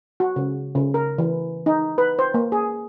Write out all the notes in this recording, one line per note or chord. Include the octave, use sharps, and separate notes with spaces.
F#4
C#3
C#3
A#4
E3
D#4
B4
C5
A#3
G#4